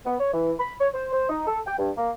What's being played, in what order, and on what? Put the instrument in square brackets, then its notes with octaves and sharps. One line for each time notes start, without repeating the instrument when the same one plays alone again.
[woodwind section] B3
C#5
E3
B5
C#5
C5
C5
D#4
A4
G5
G2
A#3